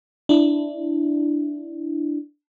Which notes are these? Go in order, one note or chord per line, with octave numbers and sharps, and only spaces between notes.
D4 E4